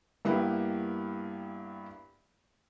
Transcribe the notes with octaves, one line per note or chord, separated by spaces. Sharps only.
G2 A#3 B3 E4 G4